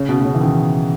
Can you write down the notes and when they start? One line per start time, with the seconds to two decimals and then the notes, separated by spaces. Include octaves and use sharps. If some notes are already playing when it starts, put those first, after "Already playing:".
Already playing: C#3
0.09 B2
0.21 B2
0.25 C#3
0.34 E3
0.41 D#3